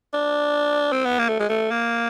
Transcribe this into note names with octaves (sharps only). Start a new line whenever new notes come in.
D4
C4
B3
A#3
A3
G#3
A3
A#3